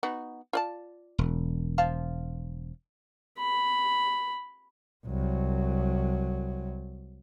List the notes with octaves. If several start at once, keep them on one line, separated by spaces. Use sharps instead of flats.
B3 D#4 F#4
F4 D5 A5
E1
F3 F5 A5
B5
C2 F#3